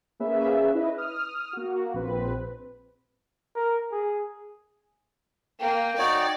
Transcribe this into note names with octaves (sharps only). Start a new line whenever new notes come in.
A#3 C#4 G#4 B4 E5
E4 B4 D#5 E5
D#6 F6
A#3 F#4
A#1 C4 B4
A#4
G#4
A#3 G5
D#4 F#4 C#5 D5